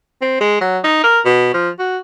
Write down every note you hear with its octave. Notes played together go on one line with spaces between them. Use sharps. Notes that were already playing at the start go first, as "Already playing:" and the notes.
C4
G#3
F#3
D#4
A#4
B2
F3
F#4